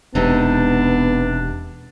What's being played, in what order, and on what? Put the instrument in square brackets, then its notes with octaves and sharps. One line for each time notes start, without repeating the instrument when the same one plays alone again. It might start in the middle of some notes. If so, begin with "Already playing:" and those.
[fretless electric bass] E1 [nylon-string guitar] C3 G#3 D#4 [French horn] B3 [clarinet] D4